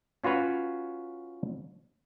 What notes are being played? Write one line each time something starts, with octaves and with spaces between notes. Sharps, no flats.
C#4 F4 F#4 B4 C#5